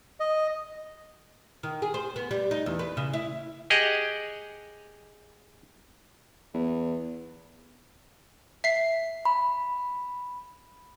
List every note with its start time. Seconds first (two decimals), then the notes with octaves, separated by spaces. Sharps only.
0.20 D#5
1.63 D#3
1.82 G#4
1.94 C5
2.16 B3
2.31 G3
2.51 D#4
2.66 E2
2.79 B4
2.97 C#3
3.13 E4
3.70 G4 G#4 D#5 F#5
6.54 E2
8.64 E5 C7
9.25 B5